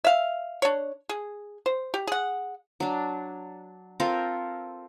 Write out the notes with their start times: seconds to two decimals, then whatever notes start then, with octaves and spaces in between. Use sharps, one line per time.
0.04 E5 F5
0.62 D4 C#5
1.09 G#4
1.66 C5
1.94 G4
2.07 G#4 F#5
2.80 F#3 D4
4.00 C4 F4 A4 A#4